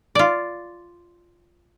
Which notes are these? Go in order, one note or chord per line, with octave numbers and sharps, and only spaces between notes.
F4 D5